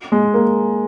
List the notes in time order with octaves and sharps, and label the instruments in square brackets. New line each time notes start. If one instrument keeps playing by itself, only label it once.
[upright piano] G#3
A#3